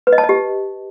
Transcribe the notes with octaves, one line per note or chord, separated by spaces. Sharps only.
B4
D#5
A5
D#5
G4